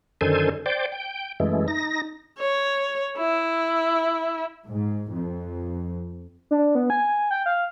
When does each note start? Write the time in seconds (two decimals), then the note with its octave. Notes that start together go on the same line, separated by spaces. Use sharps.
0.21 F#2 D3 D#3 A4 C5 G#5
0.66 C5 D5 G5
0.92 G5
1.40 F#2 E3 G#3 A3
1.68 D#4 A#6
2.38 C#5
3.17 E4
4.66 G#2
5.11 F2
6.51 D4
6.75 B3
6.90 G#5
7.31 G5
7.46 F5